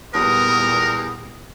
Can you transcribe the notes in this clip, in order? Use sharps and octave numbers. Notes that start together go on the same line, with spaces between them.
E2 A#2 G3 B3 A#4 D#6